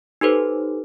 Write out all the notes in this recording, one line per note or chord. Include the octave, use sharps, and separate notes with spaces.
D#4 G4 A4 B4 C5